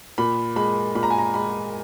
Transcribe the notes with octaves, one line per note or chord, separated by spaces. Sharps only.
A#2 B5
G#3 B5
A#2 B5
A#5
G#5
A#5
G#3 B5